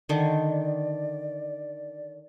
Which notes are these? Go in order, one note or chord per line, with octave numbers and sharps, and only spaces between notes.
D3 D#3 D5